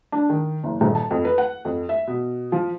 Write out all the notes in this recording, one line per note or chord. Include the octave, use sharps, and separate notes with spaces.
D4
D#3
F#1
D#1
A5
F2
B4
F#5
F2
E5
B2
F3